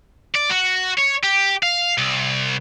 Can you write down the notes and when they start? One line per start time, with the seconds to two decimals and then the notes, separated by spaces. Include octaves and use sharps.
0.35 D5
0.50 F#4
0.98 C#5
1.23 G4
1.63 F5
1.98 C2